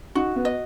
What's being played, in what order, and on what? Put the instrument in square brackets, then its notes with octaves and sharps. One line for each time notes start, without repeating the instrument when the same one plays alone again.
[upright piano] D#4 [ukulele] F#4
[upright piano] B3
[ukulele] D#5